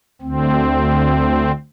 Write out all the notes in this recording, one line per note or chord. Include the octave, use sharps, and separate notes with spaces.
D2 C4